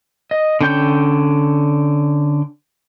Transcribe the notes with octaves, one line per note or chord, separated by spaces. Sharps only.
D#5
D3 C#4 G5 G6